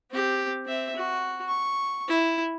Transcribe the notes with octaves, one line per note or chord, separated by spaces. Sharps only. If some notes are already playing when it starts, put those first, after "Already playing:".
C4 G4
C4 E5
F#4
C#6
E4